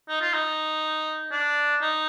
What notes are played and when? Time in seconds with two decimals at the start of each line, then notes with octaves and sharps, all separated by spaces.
0.08 D#4
0.21 F4
0.34 D#4
1.32 D4
1.81 D#4